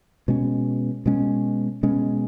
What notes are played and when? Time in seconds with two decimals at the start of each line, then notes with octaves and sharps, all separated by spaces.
0.28 B2 G#3 C#4
1.06 B2 G#3 C#4
1.83 B2 G#3 C#4